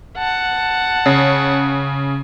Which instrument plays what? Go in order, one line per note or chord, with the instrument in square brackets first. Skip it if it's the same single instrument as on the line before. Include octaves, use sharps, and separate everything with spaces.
[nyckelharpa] F#5 A5
[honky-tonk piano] C#3